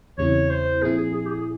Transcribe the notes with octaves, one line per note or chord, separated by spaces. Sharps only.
E2 C#3 G3 C4 E4 C#5
C5
A#2 F3 C4 E4 G#4
G#4
G#4
G4
G#4
G#4